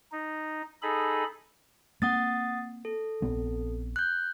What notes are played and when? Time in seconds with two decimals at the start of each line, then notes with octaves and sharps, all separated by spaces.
0.12 D#4
0.82 D#4 G#4 A4 B5
2.02 A#3 C4 F#5 D#6 A6
2.85 A4
3.22 A#1 B3 C4
3.96 F#6 G6